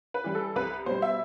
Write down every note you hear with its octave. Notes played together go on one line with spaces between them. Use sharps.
B4
E3 G3
A4
C2 B4
B2 G3 C5
E5